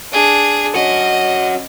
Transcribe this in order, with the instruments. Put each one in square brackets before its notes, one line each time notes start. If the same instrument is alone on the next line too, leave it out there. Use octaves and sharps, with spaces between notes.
[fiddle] D4 G#4
[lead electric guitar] C#4 F#4 [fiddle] D#5